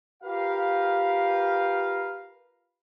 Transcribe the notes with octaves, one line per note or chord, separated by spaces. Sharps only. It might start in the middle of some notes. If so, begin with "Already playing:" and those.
F4 G4 A#4 B4 F5